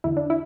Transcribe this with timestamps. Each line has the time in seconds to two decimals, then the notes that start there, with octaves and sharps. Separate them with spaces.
0.04 E2 D3 E4
0.17 D4
0.30 E4